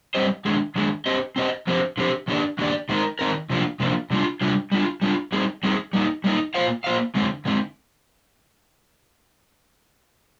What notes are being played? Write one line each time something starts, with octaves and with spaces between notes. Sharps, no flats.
G3 C4 G4 C5 D#5
D#3 G#3 D4 G#4
D#3 G#3 D4 G#4
C4 G4 C5 D#5
C4 G4 C5 D#5
D3 F3 C4 G4 C5
D3 F3 C4 G4 C5
D#3 A#3 D4 G4 D5
D#3 A#3 D4 G4 D5
D#3 G#3 C4 D#4 A#4
D#3 G#3 C4 D#4 A#4
C3 F3 A#3 D4 F4
C3 F3 A#3 D4 F4
C3 G3 D4 F4
C3 G3 D4 F4
G3 D4 F4
G3 D4 F4
G3 C4 D#4 G#4
G3 C4 D#4 G#4
G3 A#3 D#4
G3 A#3 D#4
A#3 F4 C5 F5
A#3 F4 C5 F5
D3 G#3 C4
D3 G#3 C4